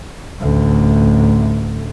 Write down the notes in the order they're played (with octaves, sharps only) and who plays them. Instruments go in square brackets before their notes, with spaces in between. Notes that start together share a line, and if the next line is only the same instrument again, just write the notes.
[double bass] A1 D2